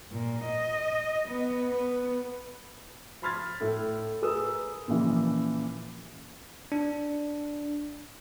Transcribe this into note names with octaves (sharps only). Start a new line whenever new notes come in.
A#2
D#5
B3
B3
A5 B5 C6 F6 G#6 A6
A2 A4
G#4 A#4 B4 D#6 E6
A#2 C#3 E3 F3
D4